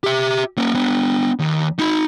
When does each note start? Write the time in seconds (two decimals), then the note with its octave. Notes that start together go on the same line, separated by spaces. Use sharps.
0.04 G4 E5
0.57 A#3 C#4
0.74 B3 D4
1.39 D#2
1.79 D#4 B5